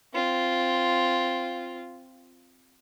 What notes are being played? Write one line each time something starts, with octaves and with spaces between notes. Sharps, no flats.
C4 F4